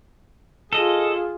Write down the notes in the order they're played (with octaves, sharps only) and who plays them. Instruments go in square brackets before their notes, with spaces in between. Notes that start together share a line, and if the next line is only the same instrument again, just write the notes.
[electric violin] F4 G#4 [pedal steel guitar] A4 D#5